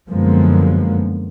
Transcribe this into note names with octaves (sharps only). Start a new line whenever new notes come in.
F#2 D3 F3 G#3 A#3 B3